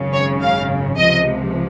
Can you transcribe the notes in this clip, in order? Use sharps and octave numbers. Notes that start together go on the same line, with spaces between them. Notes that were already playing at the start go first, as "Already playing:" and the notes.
Already playing: G#1 F#2 C#3
C#5
F5
C#2 C3 F3 D#5